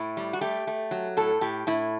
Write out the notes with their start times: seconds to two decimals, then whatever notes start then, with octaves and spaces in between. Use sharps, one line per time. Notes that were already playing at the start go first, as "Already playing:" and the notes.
Already playing: A2 E4
0.17 G3
0.33 F#4
0.41 A3 G4
0.67 A3
0.91 F#3
1.17 A2 A4
1.41 A2 G4
1.67 A2 E4